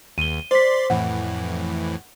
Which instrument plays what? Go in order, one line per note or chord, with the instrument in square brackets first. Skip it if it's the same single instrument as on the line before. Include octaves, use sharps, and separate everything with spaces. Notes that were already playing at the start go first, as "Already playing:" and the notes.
[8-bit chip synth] D#2 [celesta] D#7 G7
[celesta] C5 B6 [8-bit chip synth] D5 C6
[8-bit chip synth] F2 A2 E3 [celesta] F#5